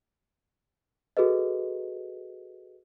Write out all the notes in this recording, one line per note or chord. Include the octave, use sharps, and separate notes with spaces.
F#4 G#4 A4 B4 D#5